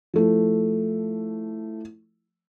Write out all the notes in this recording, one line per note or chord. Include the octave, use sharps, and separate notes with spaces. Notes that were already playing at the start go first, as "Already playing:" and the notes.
F3 A3 E4